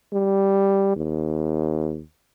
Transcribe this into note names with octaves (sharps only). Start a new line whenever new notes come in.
G3
D#2